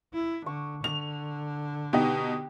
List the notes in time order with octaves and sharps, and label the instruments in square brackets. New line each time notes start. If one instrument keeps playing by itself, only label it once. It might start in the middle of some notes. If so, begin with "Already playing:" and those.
[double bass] E4
[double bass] D3 [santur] C#6
[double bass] D3 [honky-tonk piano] F7
[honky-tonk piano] B2 B3 D#4 [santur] G4